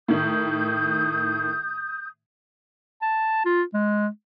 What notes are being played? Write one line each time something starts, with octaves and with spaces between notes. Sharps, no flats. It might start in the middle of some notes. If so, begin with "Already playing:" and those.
A2 D#3 D#6 G6
A5
F4
G#3